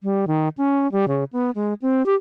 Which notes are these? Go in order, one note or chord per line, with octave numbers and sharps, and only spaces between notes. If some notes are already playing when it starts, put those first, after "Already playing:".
G3
D#3
C#4
G3
C#3
B3
G#3
C4
G4